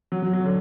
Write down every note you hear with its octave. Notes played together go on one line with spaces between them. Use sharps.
F#3
F#3
F#3
D3